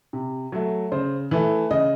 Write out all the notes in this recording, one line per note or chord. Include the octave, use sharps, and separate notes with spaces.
C3
F#3 A3
C#3 C5
E3 A3
C#3 D#5